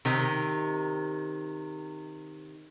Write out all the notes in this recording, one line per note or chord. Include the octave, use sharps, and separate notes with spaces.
C3 D#3